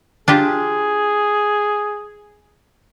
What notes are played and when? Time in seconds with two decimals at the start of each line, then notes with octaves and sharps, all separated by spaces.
0.28 D4 F4 G4 G#4